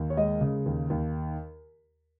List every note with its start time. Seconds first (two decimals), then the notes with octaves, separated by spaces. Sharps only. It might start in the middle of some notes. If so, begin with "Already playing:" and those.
Already playing: D#2
0.10 C#5
0.17 G#3 D#5
0.41 C#3
0.66 D#2
0.90 D#2